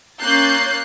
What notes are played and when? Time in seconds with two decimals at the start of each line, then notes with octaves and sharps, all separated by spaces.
0.20 A#3 C#4 F#6 G6 A6 C7